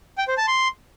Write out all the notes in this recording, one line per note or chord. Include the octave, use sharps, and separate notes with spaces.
G5
C5
A5
C6